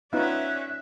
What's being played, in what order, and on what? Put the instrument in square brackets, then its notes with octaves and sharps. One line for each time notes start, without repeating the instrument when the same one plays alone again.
[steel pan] B3 D#4 F4 [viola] C#4 D5 [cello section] E5 [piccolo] F#6